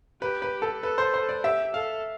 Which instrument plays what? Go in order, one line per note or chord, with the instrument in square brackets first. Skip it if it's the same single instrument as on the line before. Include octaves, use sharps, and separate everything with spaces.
[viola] G4 [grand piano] B4
[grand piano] B4
A4
[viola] A4 [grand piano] B4
[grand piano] C5
C5
D5
[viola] G4 [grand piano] E5
[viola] A4 [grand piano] F5